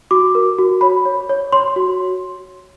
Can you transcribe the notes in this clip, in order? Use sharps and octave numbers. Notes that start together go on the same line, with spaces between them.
F#4 D6
A#4
F#4
C#5 B5
C#5
C#5
C#5 C6
F#4